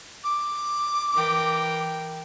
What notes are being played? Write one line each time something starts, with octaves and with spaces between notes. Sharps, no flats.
D6
E3 A#4 G5